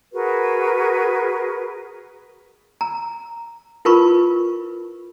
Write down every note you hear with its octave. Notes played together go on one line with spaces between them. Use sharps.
F#4 G#4 A#4 B4
A#5
E4 F4 A#4 B4 B5 C#6